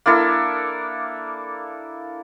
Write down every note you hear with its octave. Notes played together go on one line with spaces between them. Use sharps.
A#3 D4 E4 A4